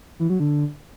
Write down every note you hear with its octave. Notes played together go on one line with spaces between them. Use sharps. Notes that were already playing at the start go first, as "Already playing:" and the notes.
E3
F#3
D3